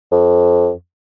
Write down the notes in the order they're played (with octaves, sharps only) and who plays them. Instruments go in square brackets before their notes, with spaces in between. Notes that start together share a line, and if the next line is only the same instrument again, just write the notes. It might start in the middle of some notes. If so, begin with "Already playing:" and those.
[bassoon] F2